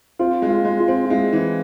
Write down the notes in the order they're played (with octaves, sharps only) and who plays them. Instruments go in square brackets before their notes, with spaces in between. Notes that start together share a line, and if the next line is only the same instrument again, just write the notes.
[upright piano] C4 [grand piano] F4
[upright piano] G#3
[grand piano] F4
[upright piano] G#3
[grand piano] F4
[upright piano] C4
[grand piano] F4
[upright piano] G#3 [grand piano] E4
[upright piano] E3